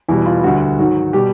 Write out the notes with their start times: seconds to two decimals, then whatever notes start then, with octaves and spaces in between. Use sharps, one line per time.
0.08 E2 B2 G3 E4
0.26 F4
0.43 D2 D3 G3 F#4
0.78 G#2 D#3 F#3
1.13 B2 G3 G4